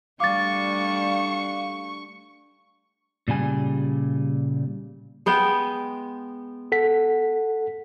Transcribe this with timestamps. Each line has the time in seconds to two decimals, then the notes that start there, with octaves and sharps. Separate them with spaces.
0.20 G3 A3 D4 F5 C#6 D6 A6
3.28 A#2 C#3 G3 G#5
5.26 G#3 B3 G5
6.72 A4 F#5 B6